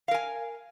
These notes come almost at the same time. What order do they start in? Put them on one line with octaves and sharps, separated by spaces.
F5 A#4 G#5